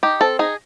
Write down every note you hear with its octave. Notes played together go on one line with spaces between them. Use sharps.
D#4 G4
C4 A4
D#4 G#4